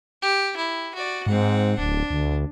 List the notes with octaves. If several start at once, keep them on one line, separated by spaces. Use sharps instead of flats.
G4
E4
F#4 D5
G#2 C4 F#5
D1 D4
D2